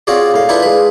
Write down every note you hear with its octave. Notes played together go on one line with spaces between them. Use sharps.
C4 C#4 F4 F#4 G#4 D5
A2 F5
D4 E4 F4 A4 B4 C5
G#3 B4